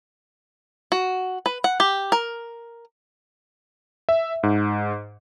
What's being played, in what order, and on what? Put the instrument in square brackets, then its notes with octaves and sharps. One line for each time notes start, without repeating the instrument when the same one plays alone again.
[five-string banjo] F#4
B4
F#5
G4
A#4
[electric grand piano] E5
G#2